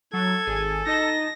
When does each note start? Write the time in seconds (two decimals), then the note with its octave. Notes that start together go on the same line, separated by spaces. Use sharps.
0.13 F#3 A4 G#6
0.47 G#1 G#4 G#5
0.86 D#4 D#5 A5 A#6